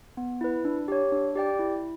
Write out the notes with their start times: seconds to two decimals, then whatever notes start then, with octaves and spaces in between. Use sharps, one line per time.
0.17 B3
0.41 E4 B4
0.65 D4
0.88 G4 C#5
1.12 D4
1.35 G4 D5 G5
1.59 E4